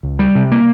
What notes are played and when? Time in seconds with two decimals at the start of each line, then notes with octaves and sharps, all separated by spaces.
0.03 C#2
0.19 G3
0.35 C3
0.52 A#3